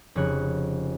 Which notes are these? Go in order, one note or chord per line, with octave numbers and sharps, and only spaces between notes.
F1 C#3 C#5 F#6